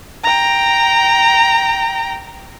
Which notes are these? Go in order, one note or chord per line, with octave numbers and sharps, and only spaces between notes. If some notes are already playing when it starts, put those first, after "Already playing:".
G5 A#5